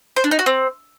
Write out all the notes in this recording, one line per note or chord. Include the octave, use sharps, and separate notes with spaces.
C5
D4
D#4
F#4
C4